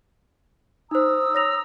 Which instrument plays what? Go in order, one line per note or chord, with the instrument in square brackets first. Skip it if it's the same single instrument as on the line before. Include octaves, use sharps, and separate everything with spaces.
[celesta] D#4 C5 [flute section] A#5 D#6 E6
[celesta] C#5 A#6 F7